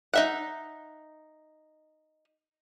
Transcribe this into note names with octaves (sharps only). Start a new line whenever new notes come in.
D#4 E5 F#5